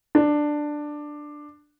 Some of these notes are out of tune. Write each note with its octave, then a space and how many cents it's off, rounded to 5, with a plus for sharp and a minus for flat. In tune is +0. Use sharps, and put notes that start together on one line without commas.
D4 +10